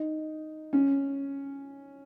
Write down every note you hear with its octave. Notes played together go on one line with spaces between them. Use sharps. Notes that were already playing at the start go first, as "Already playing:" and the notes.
Already playing: D#4
C#4